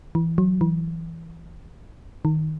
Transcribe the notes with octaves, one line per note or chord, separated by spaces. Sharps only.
E3
F#3
E3
D#3